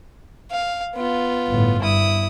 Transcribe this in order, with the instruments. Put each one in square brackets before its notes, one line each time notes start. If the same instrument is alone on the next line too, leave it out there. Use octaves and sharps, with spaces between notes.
[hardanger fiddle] F5
B3 F4
[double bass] G1 A2
[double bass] G2 [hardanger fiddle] E4 D#6